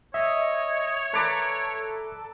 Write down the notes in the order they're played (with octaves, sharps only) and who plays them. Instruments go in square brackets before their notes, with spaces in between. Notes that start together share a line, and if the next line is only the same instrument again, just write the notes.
[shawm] C#5 [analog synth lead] D#5 [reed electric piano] E5
[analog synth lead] A4 [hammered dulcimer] B4 D5 A#5